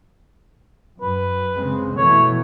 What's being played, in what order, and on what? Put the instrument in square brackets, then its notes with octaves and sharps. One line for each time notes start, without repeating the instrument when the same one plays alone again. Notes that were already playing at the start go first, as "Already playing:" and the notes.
[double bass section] F#2 [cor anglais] B4
[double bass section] C#3 G#3 C4
[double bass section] B2 E3 A3 [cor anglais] C#5